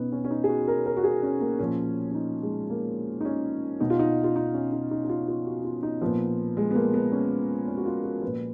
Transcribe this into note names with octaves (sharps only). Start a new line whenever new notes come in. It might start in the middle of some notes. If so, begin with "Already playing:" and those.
Already playing: B2 B3 C#4 D#4
C#4
C#4
D#4
G#4
F#4
A#4
A#4
F#4
G#4
C#4
A#3
A#2 F3 C#4
C#4
D#4
G#3
A#3
D#4
C#4
B2 D#4
F4
D#4
F4
D#4
C#4
D#4
D#4
D#4
F4
F4
F#4
F4
D#4
A#2 F3 B3
G#3
B3
A#3
B3
C#4
C#4
F#4
F4
F#4
A#2 F3 B4